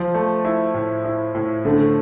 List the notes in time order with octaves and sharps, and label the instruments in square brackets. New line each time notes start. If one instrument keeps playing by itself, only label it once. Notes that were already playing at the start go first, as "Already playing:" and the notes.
Already playing: [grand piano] F3
[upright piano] A3
E4
A2
E4
A2
[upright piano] D3 [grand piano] A3